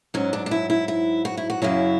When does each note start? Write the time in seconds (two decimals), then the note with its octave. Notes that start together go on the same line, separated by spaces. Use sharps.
0.14 G#2 F#3 C#4
0.33 D4
0.46 D4
0.51 E4
0.70 E4
0.88 E4
1.25 F#4
1.37 E4
1.50 F#4
1.62 F#2 C#3 F#3 E4